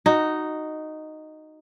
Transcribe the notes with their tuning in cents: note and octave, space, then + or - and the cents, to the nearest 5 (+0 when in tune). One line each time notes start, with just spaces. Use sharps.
D#4 -5 F#4 +0